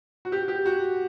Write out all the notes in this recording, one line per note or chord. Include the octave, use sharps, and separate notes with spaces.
F#4
G4
G4
F#4